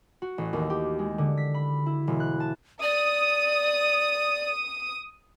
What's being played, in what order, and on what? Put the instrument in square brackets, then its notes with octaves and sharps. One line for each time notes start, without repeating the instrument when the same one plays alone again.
[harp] F#4
A1
D#2
G4
G#3
D3
B6
B5
E4
E1
F#6
A5
[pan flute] D5 [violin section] D#6